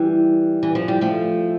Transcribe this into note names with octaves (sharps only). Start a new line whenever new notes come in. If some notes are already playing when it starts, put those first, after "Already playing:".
Already playing: E3 G3
E3
F3
G3
F3 A3